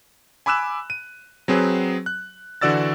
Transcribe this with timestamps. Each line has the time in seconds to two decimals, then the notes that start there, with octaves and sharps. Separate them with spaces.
0.46 G#5 B5 D6 E6 F#6 E7
0.90 D#7
1.48 F#3 C4 G#4 B4
2.06 F#6
2.61 D3 E3 F#4 D5 E6 A6